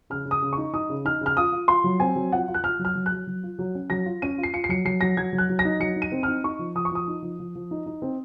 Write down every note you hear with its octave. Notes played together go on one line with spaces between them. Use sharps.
C#3 F6
C#3
D#6
C#3
D#4 C#6
D#4 D#6
C#3
D#4 F6
C#3 F6
F4 D#6
F4
F4 C6
F#3
C4 G#5
F#3
F4 F#5
F4
F#6
F4 F6
F#3
F6
F#3
F#6
F#3
F#3
F4
F#3
C#4
F#3 A#6
F4
C#4 D#7
F4
C7
F4 C#7
C7
F#3 C#7
F#3 C7
F#3 A#6
F#3 G#6
F#3
F#6
F#3
A#6
D#4
F#3 C#7
D#4
D#7
C4
F6
D#4
D#4 C#6
F3
F3 D#6
C#6
F3 D#6
D#4
F3
F3
F3
D#4
D#4
C4